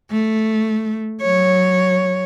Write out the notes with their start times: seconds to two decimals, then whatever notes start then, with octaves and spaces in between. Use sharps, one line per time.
0.11 A3
1.22 F#3 C#5